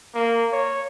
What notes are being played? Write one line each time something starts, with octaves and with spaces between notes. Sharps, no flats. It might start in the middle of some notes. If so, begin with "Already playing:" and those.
A#3
C#5